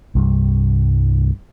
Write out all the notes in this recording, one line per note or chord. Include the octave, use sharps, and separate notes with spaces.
C2 G2